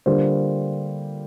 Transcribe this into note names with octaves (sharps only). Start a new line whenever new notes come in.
D3 G3 A#3 F4 C5